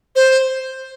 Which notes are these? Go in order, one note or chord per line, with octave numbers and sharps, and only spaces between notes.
C5